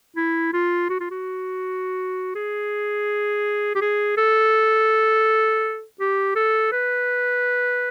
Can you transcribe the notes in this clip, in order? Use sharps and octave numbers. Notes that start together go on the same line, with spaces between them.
E4
F4
F#4
F4
F#4
G#4
G4
G#4
A4
G4
A4
B4